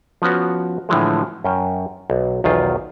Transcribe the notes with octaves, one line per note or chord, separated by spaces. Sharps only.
F3 B3 C#4 F#4
A2 D3 E3 F3 G#3
F#2 C#4 G5
B1
B1 E2 D#3 F4